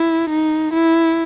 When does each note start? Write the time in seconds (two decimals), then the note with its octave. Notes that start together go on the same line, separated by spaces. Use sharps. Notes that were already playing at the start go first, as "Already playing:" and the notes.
Already playing: E4
0.30 D#4
0.74 E4